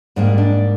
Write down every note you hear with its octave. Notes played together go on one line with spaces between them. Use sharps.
G#2 G3 A#3 D4
D4